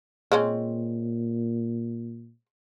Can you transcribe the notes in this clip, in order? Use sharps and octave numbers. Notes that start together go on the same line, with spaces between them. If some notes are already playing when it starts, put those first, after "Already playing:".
A#2 G#3 C4 C#4